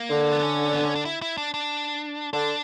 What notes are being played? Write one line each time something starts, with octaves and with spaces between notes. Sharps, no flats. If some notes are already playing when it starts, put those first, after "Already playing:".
Already playing: A#3
D3
B3
C#4
B3
C#4
D4
E4
E4
D4
D4
D3 D4